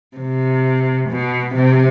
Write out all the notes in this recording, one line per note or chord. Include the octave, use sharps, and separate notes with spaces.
C3
B2
C3